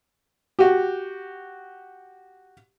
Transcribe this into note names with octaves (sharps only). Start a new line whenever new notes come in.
F#4 G4